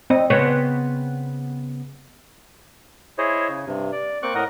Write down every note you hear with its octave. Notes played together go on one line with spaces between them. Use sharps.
C4 D#5
C#3 B3 C4 C#5
E4 G#4 C5 C#5 D#5
C#3
G2 C3
D5
A#3 C4 C#6 D6 F#6
A2 A#4 D#5 F#5